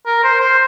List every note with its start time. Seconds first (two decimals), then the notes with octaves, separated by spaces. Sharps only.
0.06 A#4
0.24 C5
0.41 C5